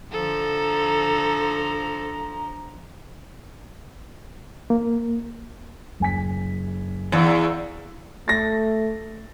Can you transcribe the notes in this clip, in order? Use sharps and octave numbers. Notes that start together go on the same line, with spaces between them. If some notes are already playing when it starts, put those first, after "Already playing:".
D3 F3 A4 C5 A#5
A#3
F#1 G#5 B6
E2 D5 F5
A3 A6 A#6